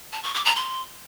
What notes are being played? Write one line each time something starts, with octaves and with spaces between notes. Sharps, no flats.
A5
C#6
D6
A#5
C6